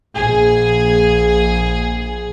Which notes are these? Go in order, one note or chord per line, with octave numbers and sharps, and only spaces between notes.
A#1 G#4